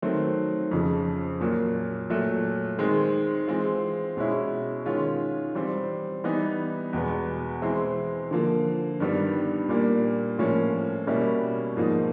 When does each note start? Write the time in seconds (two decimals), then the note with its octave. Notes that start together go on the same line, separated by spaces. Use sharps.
0.02 D#3 F#3 A3 C4
0.71 F2 C#3 F3
1.40 A#2 F#3 A#3
2.09 A#2 F#3 A3
2.79 D#3 G#3 C4
3.47 E3 G#3 C4 F4
4.17 B2 G#3 C#4 E4
4.86 D#3 G#3 C#4 F4
5.55 E3 G3 C4
6.24 E3 G3 B3 D#4
6.93 E2 B2 G#3 B3
7.62 E3 G#3 C4 E4
8.31 D3 F3 A#3
9.00 G2 D#3 G3 B3
9.69 A#2 G3 A#3 D4
10.39 A2 F3 A#3 C#4
11.07 B2 G3 A#3 C#4 E4
11.77 G#2 F3 A#3 D#4